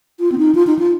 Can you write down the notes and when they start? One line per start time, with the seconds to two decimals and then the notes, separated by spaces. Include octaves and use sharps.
0.20 F4
0.32 C4
0.38 D#4
0.55 F4
0.67 D#4
0.79 F4